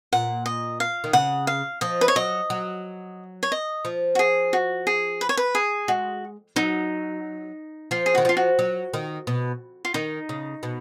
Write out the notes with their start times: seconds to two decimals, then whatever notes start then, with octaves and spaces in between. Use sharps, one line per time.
0.12 A#2 F#5
0.46 D#5
0.80 F5
1.04 D#3
1.13 C#3 F#5
1.47 F5
1.81 F3 D#5
2.01 B4
2.08 C#5
2.16 F#3 D#5
2.50 F#3
3.43 C#5
3.52 D#5
3.85 F3
4.15 F#4
4.19 G#4
4.53 F#4
4.87 G#4
5.21 B4
5.29 C#5
5.37 B4
5.55 G#4
5.88 G#3 F#4
6.56 F#3 D#4
7.91 F3 F4
8.06 G#4
8.15 D#3 F#4
8.25 F3 F4
8.37 F#4
8.59 F#3
8.94 D#3
9.27 B2
9.85 F4
9.94 D#3 D#4
10.29 C#3
10.63 B2